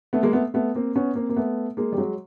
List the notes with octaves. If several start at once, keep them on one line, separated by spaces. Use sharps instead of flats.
A3 B3
G#3 A#3
A3 B3
A3 B3
A#3 C4
B3 C#4
A#3 C4
A#3
A3 B3
G#3 A#3
G3
F#3 G#3